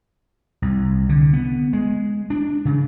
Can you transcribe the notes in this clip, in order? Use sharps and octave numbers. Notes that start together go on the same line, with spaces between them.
C2
D3
B3
G#3
D4
C#3